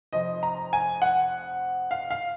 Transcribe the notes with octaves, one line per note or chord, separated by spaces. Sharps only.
F1 F2 F3 D#5
A#5
G#5
F#5
F5
F5